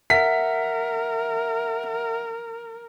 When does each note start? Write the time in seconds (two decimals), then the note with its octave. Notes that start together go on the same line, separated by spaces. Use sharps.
0.10 A#4 E5 F#5 B6